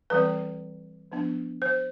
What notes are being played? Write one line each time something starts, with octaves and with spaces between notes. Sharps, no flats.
E3 G3 C4 B4
F3 B3 D4
C5